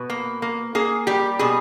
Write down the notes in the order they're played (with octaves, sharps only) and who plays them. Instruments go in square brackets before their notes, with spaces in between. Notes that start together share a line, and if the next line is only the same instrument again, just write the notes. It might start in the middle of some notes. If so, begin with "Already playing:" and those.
Already playing: [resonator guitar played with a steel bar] B2 B4
A#3
A#3
A#3 G#4
G3 G4
B2 G#4